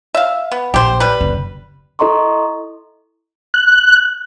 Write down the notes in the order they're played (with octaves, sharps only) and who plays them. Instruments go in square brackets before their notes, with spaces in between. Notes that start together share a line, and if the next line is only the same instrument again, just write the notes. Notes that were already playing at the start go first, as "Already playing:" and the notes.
[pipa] E5 F5
B3
[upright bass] A#1 [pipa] G4 C5
[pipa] G3 B4
[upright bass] F#1
[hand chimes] E4 A4 D#5 A#5 C6 C#6
[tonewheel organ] F#6